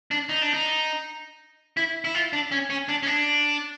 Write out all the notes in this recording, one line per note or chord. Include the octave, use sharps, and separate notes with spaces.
D4
D#4
D4
D#4
E4
E4
F4
D4
C#4
C#4
D4
C#4
D4